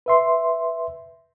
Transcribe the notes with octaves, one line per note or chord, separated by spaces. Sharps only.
B4 E5 C6